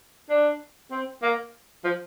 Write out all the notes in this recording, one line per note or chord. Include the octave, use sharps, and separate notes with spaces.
D4
C4
A#3
F3